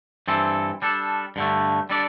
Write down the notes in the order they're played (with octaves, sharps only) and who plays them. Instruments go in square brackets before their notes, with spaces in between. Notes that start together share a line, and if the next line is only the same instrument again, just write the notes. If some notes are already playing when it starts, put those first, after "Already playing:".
[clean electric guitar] G2 E3 C4 A4
G3 D4 A4
G2 D3 A3
G3 D4 A4 D5